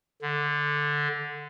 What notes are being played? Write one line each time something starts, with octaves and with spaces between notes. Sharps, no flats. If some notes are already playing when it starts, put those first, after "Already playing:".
D3